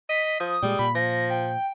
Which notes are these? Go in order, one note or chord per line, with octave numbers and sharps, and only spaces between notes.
D#5 B6
F3 D#6
A#2 G3 G#3
A#2 B5
F3 A#6
G5